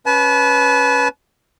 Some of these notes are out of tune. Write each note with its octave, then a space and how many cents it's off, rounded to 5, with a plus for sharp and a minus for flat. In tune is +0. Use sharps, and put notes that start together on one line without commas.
C#4 +0 B4 -5 A5 -40